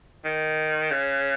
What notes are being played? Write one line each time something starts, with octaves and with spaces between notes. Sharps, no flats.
D#3
C#3